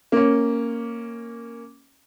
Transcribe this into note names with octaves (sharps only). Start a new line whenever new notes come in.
A#3 C#4